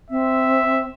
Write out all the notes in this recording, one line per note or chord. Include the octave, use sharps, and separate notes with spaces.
C4 E5